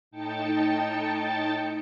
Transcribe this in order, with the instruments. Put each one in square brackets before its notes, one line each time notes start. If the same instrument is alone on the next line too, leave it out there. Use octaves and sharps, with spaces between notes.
[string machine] A2 D#4 G5 A5 A6 C#7